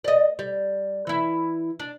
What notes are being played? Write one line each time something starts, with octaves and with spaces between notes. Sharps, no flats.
D5 D#5
G3
E3 E4
D4